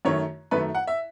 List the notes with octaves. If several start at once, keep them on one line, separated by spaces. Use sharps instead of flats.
F#2 D#3 A3 C#5
F#2 D#3 A3 B4
F#5
E5